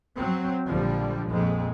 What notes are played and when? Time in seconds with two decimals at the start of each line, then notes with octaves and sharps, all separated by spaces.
0.16 F#3 C4
0.67 A#1 D3 F3 G3
1.28 A#1 F2 G#3